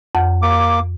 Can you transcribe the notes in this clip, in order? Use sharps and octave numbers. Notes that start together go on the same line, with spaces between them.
F2 F#5
A#3 D6